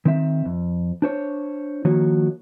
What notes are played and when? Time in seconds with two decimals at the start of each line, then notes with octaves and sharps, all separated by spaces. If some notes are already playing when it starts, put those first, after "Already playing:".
0.05 D#3 C4 E5
0.45 F2
1.02 D4 C5 C#5
1.85 D#3 F3 A#3 F#4 C#5